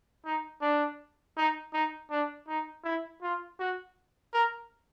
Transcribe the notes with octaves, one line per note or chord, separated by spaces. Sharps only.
D#4
D4
D#4
D#4
D4
D#4
E4
F4
F#4
A#4